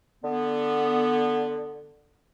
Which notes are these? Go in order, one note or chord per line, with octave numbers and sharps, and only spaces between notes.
D3 B3